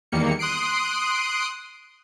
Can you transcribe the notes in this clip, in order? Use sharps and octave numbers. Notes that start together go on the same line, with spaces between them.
E2 D#3 G3 A#3 C#7
C6 D#6 F#6 C7 D7